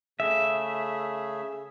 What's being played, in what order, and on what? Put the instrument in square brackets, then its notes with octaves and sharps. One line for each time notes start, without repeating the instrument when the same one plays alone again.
[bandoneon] C#3 A3 G#4 [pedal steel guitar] E5